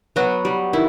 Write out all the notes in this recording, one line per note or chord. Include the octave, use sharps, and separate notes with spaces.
F#3 B3 F#4
G3
D#3 E4